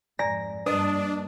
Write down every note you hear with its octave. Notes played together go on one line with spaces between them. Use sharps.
F2 G#2 D5 G#5 A#5 A#6
G2 A#3 D4 B4 D#5 D#6